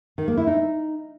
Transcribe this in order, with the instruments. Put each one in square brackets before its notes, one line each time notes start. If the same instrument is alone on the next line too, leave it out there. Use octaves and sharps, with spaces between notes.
[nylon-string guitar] D#3
A#3
E4
D#4